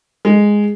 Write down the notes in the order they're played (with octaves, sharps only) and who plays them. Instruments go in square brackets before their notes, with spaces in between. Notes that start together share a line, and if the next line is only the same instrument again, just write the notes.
[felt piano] G#3